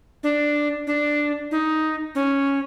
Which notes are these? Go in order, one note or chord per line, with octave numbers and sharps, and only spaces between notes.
D4
D4
D#4
C#4